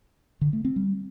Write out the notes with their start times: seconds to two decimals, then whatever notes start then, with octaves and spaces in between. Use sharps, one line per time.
0.41 D3
0.53 A3
0.65 C4
0.76 G3